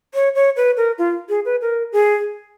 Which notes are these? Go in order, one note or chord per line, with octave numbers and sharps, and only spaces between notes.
C#5
C#5
B4
A#4
F4
G#4
B4
A#4
G#4